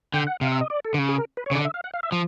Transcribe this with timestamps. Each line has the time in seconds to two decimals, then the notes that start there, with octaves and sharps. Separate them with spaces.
0.14 D3 G5
0.27 F#5
0.41 C3 F5
0.52 E5
0.61 D#5
0.70 D5
0.85 A4
0.94 D3
0.99 C#3
1.09 G#4
1.18 A#4
1.37 B4
1.46 C#5
1.51 C#3
1.55 D3 D5
1.65 E5
1.74 F5
1.84 F#5
1.94 F5
2.03 E5
2.12 F3